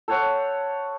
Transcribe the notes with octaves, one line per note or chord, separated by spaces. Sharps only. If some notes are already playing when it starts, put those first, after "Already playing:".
A4 C5 C#5 F#5